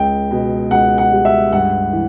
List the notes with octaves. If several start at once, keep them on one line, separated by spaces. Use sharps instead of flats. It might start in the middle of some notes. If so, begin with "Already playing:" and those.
Already playing: C#2 G5
B2
C#2 F#5
F#5
G3
E5
G2 F#5
E3